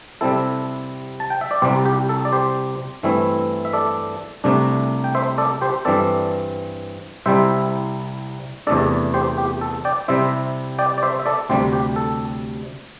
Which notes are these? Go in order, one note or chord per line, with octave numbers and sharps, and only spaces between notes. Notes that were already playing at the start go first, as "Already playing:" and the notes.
C3 G3 C4 E4 A4
A5
G5
E5
D5
C2 C3 G3 G4 C5
G4
A4
D5
G4 C5
G2 E3 A3 C4 E4
E5
A4 D5
C2 C3 A3 D4
G5
C5 E5
A4 D5
G4 C5
G2 E3 C4 A4 D5
C2 C3 G3 E4 C5 E5
E2 C3 A3 D4 A4 D5
G4 C5
G4
A4
D5 G5
C3 G3 C4 E4 C5 E5
D5 G5
D5
C5 E5
E5
A4 D5
D2 C3 G3 G4 C5
G4
A4